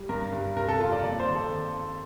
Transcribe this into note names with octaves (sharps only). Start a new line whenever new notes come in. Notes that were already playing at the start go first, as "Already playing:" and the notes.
Already playing: G3
G2 A#4
G2
C3 A#4
A4
F2 F4
D5
A#3 D5
C5
D#3
A4